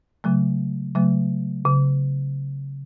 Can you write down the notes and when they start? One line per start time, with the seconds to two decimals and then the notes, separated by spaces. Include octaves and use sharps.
0.24 C#3 F#3 A3
0.95 C#3 F#3 A3
1.65 C#3